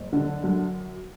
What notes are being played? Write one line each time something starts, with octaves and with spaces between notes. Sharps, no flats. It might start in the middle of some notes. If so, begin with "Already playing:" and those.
Already playing: F#1
D3
F#2